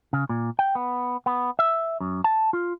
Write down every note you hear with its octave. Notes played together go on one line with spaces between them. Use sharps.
C#3
A#2
G5
B3
B3
E5
F#2
A5
F4